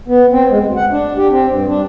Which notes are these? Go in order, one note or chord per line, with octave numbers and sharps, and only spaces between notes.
B3
C4
G#3
D2
F#5
D4
G4
C4
G2
D4